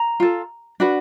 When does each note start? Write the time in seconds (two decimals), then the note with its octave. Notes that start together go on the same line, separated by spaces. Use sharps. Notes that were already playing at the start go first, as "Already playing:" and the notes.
Already playing: A#5
0.20 F4 A4
0.80 D4 F#4 B4